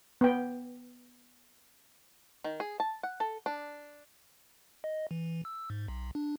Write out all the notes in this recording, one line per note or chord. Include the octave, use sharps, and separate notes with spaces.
B3 G5
D#3
G#4
A5
F#5
A4
D4
D#5
E3
E6
G#2
B1
D4